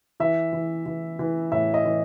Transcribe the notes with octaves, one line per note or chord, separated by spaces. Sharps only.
E3 E5
E3
E3
E3
A2 E5
D#5
E3